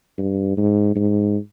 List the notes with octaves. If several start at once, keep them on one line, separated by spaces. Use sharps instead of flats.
G2
G#2
G#2